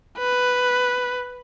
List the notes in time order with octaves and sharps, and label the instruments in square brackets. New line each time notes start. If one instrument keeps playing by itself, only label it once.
[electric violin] B4